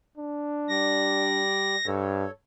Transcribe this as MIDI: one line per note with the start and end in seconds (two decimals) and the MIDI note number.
0.17 1.43 62
0.69 1.76 55
0.69 1.76 74
0.69 1.86 94
1.86 2.25 43
1.86 2.31 69
1.86 2.31 73